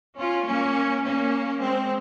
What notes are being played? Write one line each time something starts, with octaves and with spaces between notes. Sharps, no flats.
C#4 F4
A#3 C#4
A#3 C#4
G#3 C4